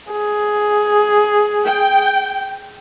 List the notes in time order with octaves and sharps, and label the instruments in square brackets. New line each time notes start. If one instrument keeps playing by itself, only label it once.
[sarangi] G#4
[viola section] G5